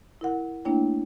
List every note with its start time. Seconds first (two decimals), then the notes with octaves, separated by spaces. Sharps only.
0.21 E4 A#4 F#5
0.65 A3 A#3 D4 E4 C#5 G5